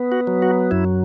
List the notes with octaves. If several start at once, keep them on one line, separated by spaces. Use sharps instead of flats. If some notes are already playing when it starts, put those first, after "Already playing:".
Already playing: B3
F#4
F#3
F#4
F#2 E4